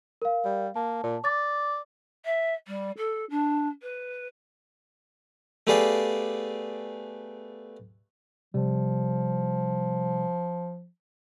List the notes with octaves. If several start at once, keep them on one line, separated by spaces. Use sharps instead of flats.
A#4 F5
G3
A#3 A5
A#2
D5 D6 A6
E5
G3
A4
D4
B4
A3 B3 G4 G#4 D5 F5
C3 F3 G3